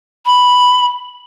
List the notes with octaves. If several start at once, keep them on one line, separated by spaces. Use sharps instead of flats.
B5